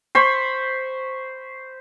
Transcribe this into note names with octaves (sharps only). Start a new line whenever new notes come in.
C5 B5 C#6